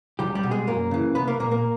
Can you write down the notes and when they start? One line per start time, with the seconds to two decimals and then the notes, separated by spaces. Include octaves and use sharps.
0.19 C#2 G3 G4
0.35 G3 G4
0.43 B2
0.51 G#3 G#4
0.67 F#2 A#3 A#4
0.91 C#3 E3
1.15 C2 B3 B4
1.27 A#3 A#4
1.40 A#2 A#3 A#4
1.51 A#3 A#4